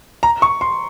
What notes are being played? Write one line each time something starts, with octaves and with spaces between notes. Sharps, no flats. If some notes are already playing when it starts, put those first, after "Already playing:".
A#5
C#6
C6